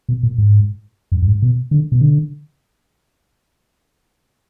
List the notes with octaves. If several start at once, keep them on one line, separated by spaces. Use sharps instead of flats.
B2
A#2
G#2
F#2
F#2
G#2
B2
D3
B2
D3